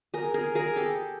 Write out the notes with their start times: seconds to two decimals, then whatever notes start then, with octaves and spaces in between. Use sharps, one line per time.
0.14 G#4 A#4
0.34 G#4 A#4
0.55 G#4 A#4
0.76 G4 A4